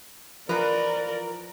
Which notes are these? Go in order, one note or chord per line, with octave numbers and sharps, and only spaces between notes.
E3 F3 A#4 B4 D5 A#5 D7